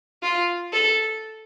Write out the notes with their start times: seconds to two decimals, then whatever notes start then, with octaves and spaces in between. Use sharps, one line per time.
0.23 F4
0.73 A4